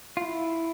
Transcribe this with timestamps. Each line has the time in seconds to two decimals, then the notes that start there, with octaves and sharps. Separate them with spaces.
0.17 F4
0.22 E4